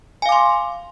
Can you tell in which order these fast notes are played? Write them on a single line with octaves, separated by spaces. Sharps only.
G#5 F5 D6 C6